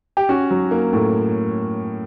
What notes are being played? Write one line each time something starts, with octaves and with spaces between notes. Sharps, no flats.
G4
C#4 F#4
F#3
A#3
A2